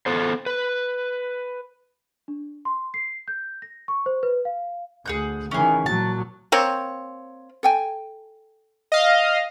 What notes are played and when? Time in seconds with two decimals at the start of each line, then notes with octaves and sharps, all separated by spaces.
0.06 B3 A4 C5
0.46 B4
2.28 D4
2.65 C6
2.94 C7
3.28 G6
3.62 A#6
3.88 C#6
4.06 C5
4.23 B4
4.45 F5
5.06 D2 G#4 F#5 G6
5.51 D#3 E3 C#4 G#4
5.86 A#2 F#3 A5
6.52 A#3 C4 C#5
7.63 A4 G5 G#5
8.92 D#5 F5